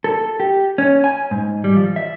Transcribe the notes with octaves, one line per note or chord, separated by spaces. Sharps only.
A4
G4
C#4
G#5
G#2
G3
F3
E5